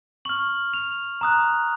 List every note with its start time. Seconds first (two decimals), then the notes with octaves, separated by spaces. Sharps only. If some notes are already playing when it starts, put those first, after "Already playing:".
0.25 C#6 F6 F#7
0.74 F7
1.21 A#5 D#6 F#6